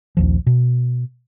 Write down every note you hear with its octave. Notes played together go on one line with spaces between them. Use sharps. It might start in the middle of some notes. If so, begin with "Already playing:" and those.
A#1 D#2 F3
B2